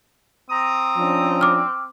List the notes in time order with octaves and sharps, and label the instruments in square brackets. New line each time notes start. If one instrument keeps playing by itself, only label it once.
[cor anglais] C4 [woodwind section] A#5 D#6
[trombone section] F3 C#4 D4
[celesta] D6 F6